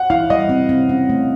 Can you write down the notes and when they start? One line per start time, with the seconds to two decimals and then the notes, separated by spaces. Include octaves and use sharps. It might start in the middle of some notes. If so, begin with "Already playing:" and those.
Already playing: F#5
0.10 E4 F5
0.30 G3 D#5
0.49 C4
0.69 C4
0.89 C#4
1.09 A3